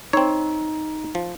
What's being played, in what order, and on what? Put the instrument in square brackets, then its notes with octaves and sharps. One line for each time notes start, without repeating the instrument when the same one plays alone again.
[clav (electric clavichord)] C4 C#5 [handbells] D#4
[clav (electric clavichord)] F3